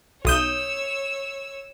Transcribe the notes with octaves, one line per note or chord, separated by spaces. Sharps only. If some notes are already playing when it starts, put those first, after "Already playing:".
B1 C#5 D#6 E6 G6